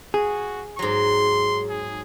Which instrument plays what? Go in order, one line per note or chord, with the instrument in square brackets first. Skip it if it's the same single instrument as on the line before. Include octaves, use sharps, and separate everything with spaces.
[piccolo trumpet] F#4 [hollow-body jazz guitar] G#4
[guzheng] G#2 F#3 [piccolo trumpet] C6
[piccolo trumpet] G#4